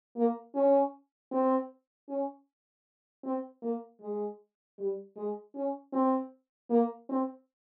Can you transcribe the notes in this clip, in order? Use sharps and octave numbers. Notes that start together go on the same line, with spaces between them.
A#3
C#4
C4
C#4
C4
A#3
G#3
G3
G#3
C#4
C4
A#3
C4